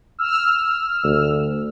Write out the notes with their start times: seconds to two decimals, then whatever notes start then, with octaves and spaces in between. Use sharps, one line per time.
0.19 E6 F6
1.04 D2